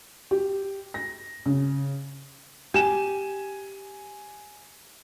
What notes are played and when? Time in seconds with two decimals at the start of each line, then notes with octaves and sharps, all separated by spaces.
0.31 G4
0.94 A#6
1.46 C#3
2.74 G4 G#5 E7